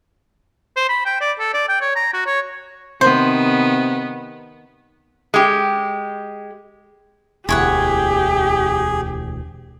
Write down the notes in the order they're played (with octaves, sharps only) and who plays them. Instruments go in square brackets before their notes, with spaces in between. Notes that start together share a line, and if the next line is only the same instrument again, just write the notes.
[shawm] C5
B5
G5
D5
A4
D5
G5
C#5
A#5
F#4
C#5
[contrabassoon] C3 [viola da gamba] D#3 B3 [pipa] C5
[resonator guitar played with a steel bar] G#3 G4
[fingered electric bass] E1 D2 [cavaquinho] E4 C#5 F#5 [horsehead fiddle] G4 [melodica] G#4